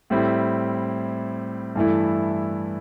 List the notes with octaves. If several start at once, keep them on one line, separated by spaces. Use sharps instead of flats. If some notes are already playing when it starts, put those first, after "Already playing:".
A2 G3 C4 E4
G2 E3 A3 E4